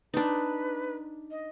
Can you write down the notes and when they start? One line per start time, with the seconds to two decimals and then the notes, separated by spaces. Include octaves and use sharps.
0.14 D4 D#4 B4
1.31 D#5